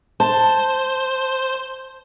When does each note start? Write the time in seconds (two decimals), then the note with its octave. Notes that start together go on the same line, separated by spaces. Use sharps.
0.20 C5 A5